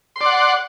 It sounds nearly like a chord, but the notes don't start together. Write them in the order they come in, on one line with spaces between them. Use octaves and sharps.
C6 D5 F#5